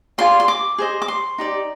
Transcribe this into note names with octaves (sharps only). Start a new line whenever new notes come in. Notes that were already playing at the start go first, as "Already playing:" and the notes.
F4 G#4 D5 C6
C6
D6
G#4 C5 D#5
D6
C6
D#4 G4 D5